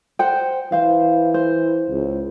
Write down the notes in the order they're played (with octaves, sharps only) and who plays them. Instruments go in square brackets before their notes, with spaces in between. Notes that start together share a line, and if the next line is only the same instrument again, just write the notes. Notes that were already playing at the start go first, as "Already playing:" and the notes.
[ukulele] C5 F#5 G5
[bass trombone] E3 [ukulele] C5 F5
[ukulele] C5
[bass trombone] C#2